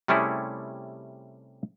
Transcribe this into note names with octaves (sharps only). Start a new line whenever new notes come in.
C3 G3 A3 C#4 E4 G#4